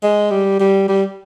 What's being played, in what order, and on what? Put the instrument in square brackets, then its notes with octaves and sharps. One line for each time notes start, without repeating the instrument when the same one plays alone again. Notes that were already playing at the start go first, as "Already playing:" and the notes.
[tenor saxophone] G#3
G3
G3
G3